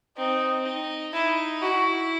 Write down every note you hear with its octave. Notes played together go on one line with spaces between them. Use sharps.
C4 D#4
D#4
D#4 E4
E4 F#4